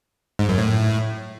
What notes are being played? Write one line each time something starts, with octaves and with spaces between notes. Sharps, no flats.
G#2
F#2
A2